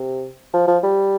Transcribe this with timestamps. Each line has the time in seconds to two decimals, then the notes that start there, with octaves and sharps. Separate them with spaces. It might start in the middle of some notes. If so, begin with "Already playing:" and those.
Already playing: C3
0.54 F3
0.67 F3
0.83 G3